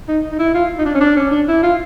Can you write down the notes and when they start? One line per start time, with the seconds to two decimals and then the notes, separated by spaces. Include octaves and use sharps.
0.08 D#4
0.32 D#4
0.39 E4
0.54 F4
0.78 D#4
0.86 D4
0.94 C#4
1.01 D4
1.16 C#4
1.31 D4
1.48 E4
1.63 F4